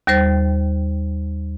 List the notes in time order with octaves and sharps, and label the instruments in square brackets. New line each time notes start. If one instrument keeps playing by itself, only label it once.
[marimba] D#2 G3 C5 A6